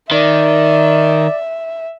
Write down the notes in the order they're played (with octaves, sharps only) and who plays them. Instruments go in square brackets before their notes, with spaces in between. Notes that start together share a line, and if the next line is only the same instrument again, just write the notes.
[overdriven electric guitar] D#3 [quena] D5 [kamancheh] E5